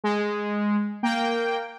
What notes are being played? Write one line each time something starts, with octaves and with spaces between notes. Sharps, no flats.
G#3
A#3 G5